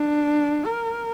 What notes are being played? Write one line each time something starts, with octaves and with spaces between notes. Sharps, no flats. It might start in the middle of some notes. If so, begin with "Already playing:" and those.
Already playing: D4
A#4